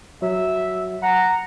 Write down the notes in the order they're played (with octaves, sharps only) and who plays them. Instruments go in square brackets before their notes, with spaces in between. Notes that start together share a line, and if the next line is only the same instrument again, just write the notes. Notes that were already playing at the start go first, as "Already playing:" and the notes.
[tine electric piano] F#3 [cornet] E5
[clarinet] F#5 [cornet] A#5